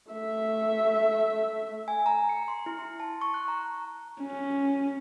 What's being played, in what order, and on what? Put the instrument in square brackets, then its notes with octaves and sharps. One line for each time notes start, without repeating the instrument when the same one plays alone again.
[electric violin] A3 E5
[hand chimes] G#5
A#5
C#7
C6
E4
C6
A5
C#6
F#6
A#5
[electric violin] C#4